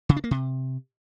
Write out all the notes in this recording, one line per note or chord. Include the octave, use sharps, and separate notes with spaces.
C#3
D4
A#3
C3